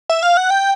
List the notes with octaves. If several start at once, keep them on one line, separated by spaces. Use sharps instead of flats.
E5
F5
F#5
G5